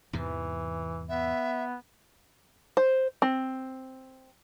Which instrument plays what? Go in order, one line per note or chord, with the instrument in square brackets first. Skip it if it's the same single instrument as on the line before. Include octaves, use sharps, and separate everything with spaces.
[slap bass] E2 G#2 C3 [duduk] E3
[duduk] B3 [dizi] E5
[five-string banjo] C5
C4